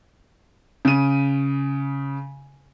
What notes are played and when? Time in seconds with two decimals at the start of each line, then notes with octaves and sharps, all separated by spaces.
0.85 C#3 D#7